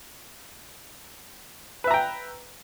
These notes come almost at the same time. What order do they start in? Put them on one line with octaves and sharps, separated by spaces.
B4 E5 A#5 G5